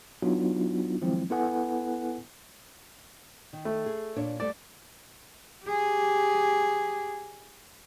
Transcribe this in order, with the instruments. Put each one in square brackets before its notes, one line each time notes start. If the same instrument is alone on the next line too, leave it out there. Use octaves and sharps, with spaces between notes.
[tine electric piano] F#3 B3 D4 D#4 F4 F#4
D#3 F3 F#3 G#3 C4 E4
B3 E4 A4 B4 F#5 G#5
[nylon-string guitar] D#3
[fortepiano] A3
[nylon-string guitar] G#4
A#2 D4 C#5
[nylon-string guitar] G3 A3 A4 [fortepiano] D5
[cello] G4 G#4